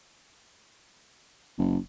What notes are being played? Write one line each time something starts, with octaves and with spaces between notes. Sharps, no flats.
F#1